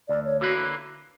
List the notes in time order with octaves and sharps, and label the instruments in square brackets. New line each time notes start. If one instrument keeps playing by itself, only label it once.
[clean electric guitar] D2 [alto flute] D5
[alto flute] C#5
[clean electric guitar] D3 A#3 E4 B4 [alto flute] F#4